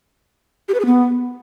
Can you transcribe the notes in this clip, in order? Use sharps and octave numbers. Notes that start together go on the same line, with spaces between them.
G4
B4
G#4
B3